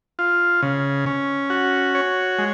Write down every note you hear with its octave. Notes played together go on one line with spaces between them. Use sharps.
F4
C#3
C#4
F#4
C#5
G#3